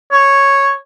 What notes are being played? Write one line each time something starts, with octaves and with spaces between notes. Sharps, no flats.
C#5